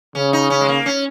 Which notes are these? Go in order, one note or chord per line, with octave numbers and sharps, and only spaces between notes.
C#3 C#4
D#4
C#4
G#3
A#3
C#4